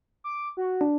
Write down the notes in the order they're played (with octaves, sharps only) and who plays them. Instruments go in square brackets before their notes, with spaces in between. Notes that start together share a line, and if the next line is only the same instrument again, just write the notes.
[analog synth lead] D6
F#4
[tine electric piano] D4